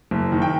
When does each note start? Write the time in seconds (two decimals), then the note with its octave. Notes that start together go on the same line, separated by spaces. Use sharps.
0.11 F#1
0.32 D#3
0.42 G5